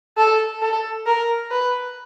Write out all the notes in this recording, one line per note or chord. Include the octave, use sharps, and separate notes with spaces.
A4
A4
A#4
B4